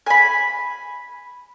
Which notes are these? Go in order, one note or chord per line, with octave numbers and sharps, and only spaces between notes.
G#5 B5